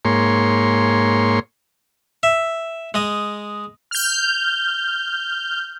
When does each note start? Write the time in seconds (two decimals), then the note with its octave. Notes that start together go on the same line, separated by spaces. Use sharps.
0.05 G#2 A#3 C#5 C6
2.23 E5
2.94 G#3 D#5
3.91 F6 G6